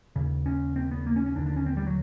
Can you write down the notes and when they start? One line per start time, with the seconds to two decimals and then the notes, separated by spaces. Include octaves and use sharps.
0.16 D#2 C#3
0.46 C#4
0.76 C4
0.91 B3
1.06 A#3
1.16 C#4
1.26 C#4
1.36 D#2 D3 D4
1.46 D4
1.56 C#4
1.66 C4
1.77 G3
1.86 F#3